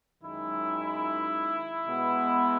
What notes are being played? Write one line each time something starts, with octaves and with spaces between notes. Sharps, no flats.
F#2 D#3 G#3 E4
B2 G#3 B3